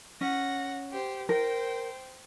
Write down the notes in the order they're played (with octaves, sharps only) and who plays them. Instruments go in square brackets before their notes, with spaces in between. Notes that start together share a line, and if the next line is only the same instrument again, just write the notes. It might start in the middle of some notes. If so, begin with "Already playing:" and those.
[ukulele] C#4 [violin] F#5 A#6
[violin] G4 C5
[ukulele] A#4 [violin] C5 G5